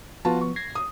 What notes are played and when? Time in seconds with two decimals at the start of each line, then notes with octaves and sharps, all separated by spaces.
0.25 F3 B3 F4 F#4 A5
0.41 C#6
0.56 G#6 A#6 C7
0.75 D#6